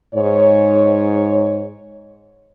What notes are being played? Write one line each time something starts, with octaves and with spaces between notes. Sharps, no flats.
G#2 C#5